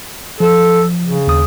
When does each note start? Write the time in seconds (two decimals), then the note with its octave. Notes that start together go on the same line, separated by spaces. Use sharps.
0.40 F3 A4
1.06 C#3
1.27 D#2 D#6